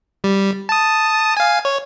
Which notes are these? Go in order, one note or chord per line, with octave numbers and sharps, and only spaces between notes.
G3
A5 D#6
F5 G#5
C#5